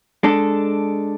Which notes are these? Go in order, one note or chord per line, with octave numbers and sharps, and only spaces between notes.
G#3 D4 A4